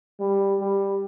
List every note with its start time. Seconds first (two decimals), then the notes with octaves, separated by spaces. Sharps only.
0.20 G3
0.60 G3